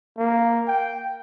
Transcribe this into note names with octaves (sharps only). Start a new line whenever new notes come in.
A#3
G5